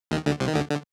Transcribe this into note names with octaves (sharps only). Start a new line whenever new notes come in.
D#2 D#3
D2 D3
C2 C3
D#3
D2 D3
D3